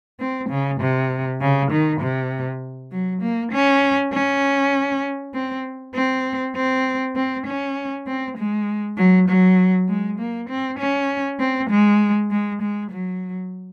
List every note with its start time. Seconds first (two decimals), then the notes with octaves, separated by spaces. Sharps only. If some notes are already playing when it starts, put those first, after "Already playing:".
0.20 C4
0.49 C#3
0.80 C3
1.41 C#3
1.71 D#3
2.01 C3
2.92 F#3
3.22 A#3
3.52 C#4
4.13 C#4
5.34 C4
5.95 C4
6.56 C4
7.16 C4
7.46 C#4
8.07 C4
8.37 G#3
8.97 F#3
9.29 F#3
9.88 G#3
10.19 A#3
10.49 C4
10.79 C#4
11.40 C4
11.70 G#3
12.31 G#3
12.62 G#3
12.91 F#3